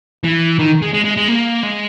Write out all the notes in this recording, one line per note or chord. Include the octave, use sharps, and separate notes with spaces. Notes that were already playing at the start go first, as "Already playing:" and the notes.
E3
D#3
G#3
G#3
G#3
G#3
A#3
G#3